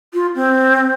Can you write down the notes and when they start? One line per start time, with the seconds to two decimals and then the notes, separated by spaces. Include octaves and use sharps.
0.14 F4
0.35 C4